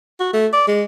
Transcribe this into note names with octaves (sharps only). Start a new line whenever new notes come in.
F#4
A3
D5
G#3